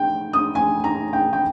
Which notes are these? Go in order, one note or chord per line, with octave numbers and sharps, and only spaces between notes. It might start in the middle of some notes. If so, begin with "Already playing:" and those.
Already playing: G5
D#6
G#5
A#5
G5
G5